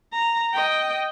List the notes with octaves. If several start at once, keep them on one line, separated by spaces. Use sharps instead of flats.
A#5
D#5 G5